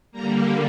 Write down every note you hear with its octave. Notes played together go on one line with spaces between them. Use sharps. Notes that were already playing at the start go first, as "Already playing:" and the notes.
D3 G3 A#3 A#5